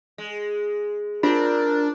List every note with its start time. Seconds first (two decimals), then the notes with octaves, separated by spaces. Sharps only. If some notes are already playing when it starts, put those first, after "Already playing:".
0.18 G#3
1.23 C4 D4 F4 A#4